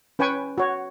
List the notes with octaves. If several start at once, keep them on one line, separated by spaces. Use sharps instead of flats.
C#4 B4 G5 G#5 C#6
F#4 C#5